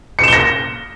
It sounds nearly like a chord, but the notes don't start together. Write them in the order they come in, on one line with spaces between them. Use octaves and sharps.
C#7 E7 G7 A#6